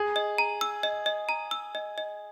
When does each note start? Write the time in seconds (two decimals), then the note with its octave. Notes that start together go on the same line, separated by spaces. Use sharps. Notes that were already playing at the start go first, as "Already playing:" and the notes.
Already playing: G#4
0.16 D#5
0.38 A#5
0.61 E6
0.83 D#5
1.06 D#5
1.29 A#5
1.51 E6
1.75 D#5
1.98 D#5